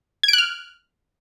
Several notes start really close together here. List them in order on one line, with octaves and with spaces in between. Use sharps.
G#6 D7 F#6 F6